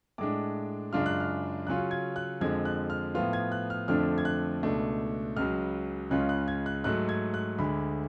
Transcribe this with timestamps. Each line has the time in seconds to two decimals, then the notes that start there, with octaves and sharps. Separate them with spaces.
0.18 A2 G#3 D4 D6
0.93 F#2 C#3 G#3 D4 F4 F6
1.06 F#6
1.20 F6
1.67 C#3 F#3 C#4 F4 F#6
1.91 G#6
2.16 F#6
2.41 F2 D3 F3 G#3 G#6
2.65 F#6
2.90 F6
3.15 A2 F3 B3 F4 F6
3.33 G#6
3.52 F#6
3.70 F6
3.88 F2 D3 F3 A3 D4 F6
4.18 G#6
4.25 F#6
4.63 C#2 B2 A3 D4
5.36 C#2 C#3 F#3 F6
6.10 C#2 C#3 G#3 C#4 F4 F#6
6.29 F#6
6.48 G#6
6.66 F#6
6.84 G#2 F#3 A3 F#6
7.09 G#6
7.34 F#6
7.58 D2 D3 G#3 B5